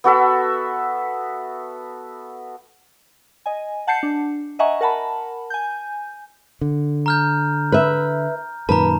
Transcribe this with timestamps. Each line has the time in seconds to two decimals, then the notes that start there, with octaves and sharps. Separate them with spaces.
0.04 B3 F#4 A4 E5
3.46 D#5 G#5
3.87 F#5 A5 G6 C7 C#7
4.03 D4
4.59 D#5 E5 F#5 G#5 A#5 C#6
4.81 A#4 F#5 A5 B5
5.50 G#5 G6
6.61 D3
7.06 A#5 F6 G6
7.72 B4 E5
8.69 F#2 A#2 D#3 B4 A5 A#5